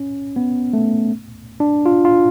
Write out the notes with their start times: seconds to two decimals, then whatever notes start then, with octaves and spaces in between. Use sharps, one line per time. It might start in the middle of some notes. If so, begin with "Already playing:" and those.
Already playing: C#4
0.36 B3
0.73 A3
1.60 D4
1.86 F4
2.05 F4